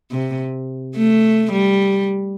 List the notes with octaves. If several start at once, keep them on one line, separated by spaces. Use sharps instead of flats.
C3
A3
G3